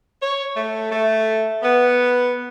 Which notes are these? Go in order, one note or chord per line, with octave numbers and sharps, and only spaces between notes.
C#5
A3
A3
B3